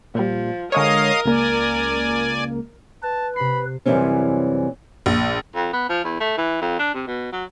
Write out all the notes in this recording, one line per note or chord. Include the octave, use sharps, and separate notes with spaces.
A#2 F3 G3
D3 G#3 A#4 C#5 D#5 F5 D#6
C#2 A#3 D5 G#5
B4 A5
C3 B5 C7
F#2 C3 E3 G3 C4 C#4
A#1
F2
B3
F3
E2
A3
E3
F2
D4
C3
B2
F#3